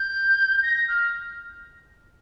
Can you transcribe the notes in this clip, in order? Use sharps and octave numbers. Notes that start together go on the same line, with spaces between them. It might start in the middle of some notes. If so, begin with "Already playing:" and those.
Already playing: G6
A#6
F6